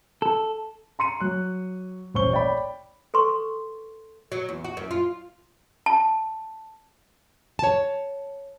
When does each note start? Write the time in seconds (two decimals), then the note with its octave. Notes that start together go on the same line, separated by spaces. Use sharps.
0.22 A4
0.99 A#5 C6 C#7 D#7
1.20 F#3 F#6
2.14 D#1 A1 C5 C#5 C#6 G7
2.32 C#5 D5 G5 B5
3.14 A4 B4 C6 C#6
4.32 F#3
4.49 E2
4.64 F#4
4.77 F#2
4.91 F4
5.86 A5
7.59 C#5 A5